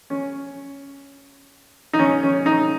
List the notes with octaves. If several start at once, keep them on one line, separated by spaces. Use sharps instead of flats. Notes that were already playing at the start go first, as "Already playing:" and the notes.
C#4
D#4
C#4
C#4
D#4